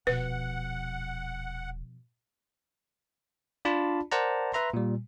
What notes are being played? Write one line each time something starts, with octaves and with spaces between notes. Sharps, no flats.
D#1 B2 F3 B4 F#5
D4 F4 D5 A5 B5
A#4 C5 D5 F#5 A5 A#5
B4 E5 A#5 C6
A#2 G3